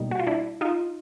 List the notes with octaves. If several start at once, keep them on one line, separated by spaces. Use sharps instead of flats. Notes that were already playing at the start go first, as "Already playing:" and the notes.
Already playing: B2 G3 A#3 D#4
F#4
F4
D4 E4
D#4 F4